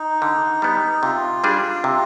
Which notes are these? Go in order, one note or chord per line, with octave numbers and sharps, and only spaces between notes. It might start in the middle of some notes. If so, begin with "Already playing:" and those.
Already playing: D#4
D3
G3 B3
C3 F4
G3 D4 G#4
C3